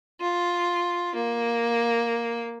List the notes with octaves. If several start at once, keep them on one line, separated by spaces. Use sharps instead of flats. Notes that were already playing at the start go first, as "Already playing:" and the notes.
F4
A#3